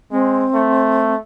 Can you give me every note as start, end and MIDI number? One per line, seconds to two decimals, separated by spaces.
0.12 0.46 56
0.12 1.13 60
0.54 1.18 57